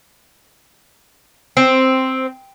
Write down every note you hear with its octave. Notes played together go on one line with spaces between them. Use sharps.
C4